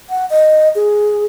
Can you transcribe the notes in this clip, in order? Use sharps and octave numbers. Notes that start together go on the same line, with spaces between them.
F#5
D#5
G#4